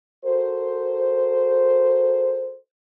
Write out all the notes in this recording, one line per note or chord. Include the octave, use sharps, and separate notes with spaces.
F#4 A4 A#4 C5